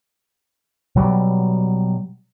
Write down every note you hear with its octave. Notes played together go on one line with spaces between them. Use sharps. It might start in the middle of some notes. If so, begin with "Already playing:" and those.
B2 F#3 G3